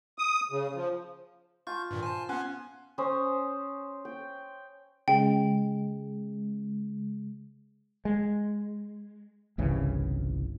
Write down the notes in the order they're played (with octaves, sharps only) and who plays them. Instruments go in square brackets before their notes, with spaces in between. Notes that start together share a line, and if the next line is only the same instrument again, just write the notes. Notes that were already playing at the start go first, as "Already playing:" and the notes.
[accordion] D#6
C#3
F3
[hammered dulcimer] F4 A5 [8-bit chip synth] C#6 G6
[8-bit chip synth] G2 A#2 D#3
[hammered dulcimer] C5 [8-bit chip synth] G#5 A5
[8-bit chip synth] B3 C#4 [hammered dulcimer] C5 F#5 G#5
[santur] C#4 C5 G#5 D#6
G5
[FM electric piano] C#3 G#3 [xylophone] G5
[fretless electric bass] G#3
G1 C2 C#3 E3